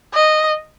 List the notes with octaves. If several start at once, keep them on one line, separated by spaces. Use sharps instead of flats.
D#5